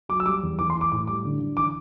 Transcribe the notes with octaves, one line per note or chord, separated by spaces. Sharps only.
F#3 D6
E6
G3 D6
E2
E3 D6
C6
E3
D6
A2 D6
G3 D6
D3
D3
E3 D6